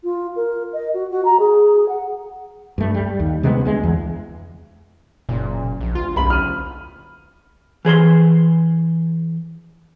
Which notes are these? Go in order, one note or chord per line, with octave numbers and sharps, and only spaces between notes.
F4
A#4
D#5
F#4
F#4
A#5
G#4
F#5
G2 A3
G3
D#2
C3 G#3 A3 B3
D2 G#3
E2
F#1 A#2
A#1
D2 F4
F#1 B1 B5 F#7
F6 D#7
E3 G#4 C5 C6